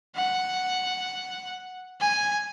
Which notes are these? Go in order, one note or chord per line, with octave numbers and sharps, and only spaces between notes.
F#5
G#5